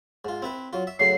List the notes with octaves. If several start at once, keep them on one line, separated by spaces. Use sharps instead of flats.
G#2 F4
C4 E4 B4
F#3 F4
E5
A2 C#3 F#3 C7